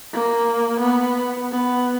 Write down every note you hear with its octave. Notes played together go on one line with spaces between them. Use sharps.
A#3
B3
B3